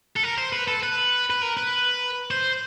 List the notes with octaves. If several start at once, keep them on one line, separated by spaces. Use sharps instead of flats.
A4
A#4
C5
B4
A4
B4
B4
A#4
B4
C5